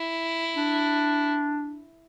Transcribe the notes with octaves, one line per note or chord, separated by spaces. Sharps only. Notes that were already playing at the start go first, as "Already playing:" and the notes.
Already playing: E4
D4